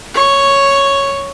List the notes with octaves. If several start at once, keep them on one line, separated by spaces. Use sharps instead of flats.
C#5 C#6